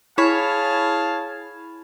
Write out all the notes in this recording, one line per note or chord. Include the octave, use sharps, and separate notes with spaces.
E4 G#4 C#5 F5 A5 B5 G#6